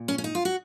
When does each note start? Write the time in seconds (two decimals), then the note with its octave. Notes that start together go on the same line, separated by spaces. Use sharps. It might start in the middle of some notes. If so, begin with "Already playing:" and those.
Already playing: A#2
0.08 C#4
0.18 C#4
0.24 D#4
0.35 F4
0.45 F#4